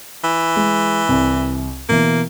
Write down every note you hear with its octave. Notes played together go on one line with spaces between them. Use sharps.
E3
G#3
C2
B2 E3 A#3